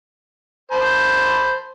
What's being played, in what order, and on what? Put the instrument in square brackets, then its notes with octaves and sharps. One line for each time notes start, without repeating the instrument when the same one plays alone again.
[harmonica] C5 A5 B5